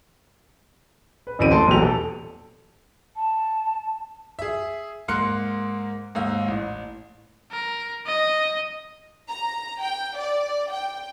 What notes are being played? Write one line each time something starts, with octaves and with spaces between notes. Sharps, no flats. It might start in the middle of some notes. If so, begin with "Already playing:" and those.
B4
D1 A1 E4 D7 D#7
A3 A5 C6 D7
A#1 E2 B2 F#3 G4 F7
A4
A5
G#4 E5
G#2 A#3 C6 F6 F#6 C#7
D#2 G#2 F5 E6
A1
A#4
D#5
A#5
G5
D5
G5